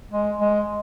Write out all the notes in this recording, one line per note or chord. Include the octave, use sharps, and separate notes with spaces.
G#3
G#3